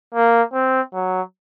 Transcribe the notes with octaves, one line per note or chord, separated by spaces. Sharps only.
A#3
C4
F#3